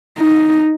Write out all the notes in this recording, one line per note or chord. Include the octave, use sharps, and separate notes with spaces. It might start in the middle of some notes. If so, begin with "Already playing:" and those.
D#4